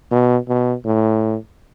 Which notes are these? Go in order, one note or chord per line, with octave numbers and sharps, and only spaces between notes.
B2
B2
A2